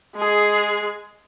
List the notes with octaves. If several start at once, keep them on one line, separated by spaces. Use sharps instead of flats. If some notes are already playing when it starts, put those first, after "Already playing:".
G#3 G#4